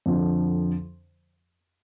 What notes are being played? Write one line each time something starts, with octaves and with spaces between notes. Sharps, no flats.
F2 D3 F3